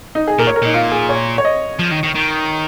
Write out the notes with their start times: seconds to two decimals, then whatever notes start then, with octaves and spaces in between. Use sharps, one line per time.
0.15 D#4
0.28 G#4
0.39 A#2 A#4
0.47 C#5
0.56 A#4
0.62 A#2 D#4
0.74 F4
0.92 G#4
1.09 C#5
1.38 C#5
1.45 D#5
1.79 F3
1.92 D#3
2.03 D#3
2.15 D#3